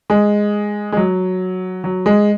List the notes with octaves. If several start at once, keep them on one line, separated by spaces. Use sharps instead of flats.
G#3
G#3
F#3
F#3
G#3